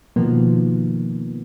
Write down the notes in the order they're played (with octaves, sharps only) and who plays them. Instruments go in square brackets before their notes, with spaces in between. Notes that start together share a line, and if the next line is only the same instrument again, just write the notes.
[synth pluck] B2 D#3 F3 A#3 B3